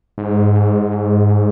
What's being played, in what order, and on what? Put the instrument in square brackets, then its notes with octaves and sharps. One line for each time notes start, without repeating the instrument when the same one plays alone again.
[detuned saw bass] G#2